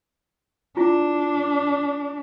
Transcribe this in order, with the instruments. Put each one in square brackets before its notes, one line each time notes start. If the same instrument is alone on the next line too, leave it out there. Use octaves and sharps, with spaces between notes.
[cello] D4 [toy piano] E4 F4